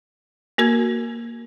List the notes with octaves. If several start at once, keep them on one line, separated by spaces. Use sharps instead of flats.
A#3 F#4 A#4 G#6